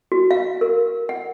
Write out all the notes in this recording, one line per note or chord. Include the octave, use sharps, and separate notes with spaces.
F#4
F5
A#4
F#5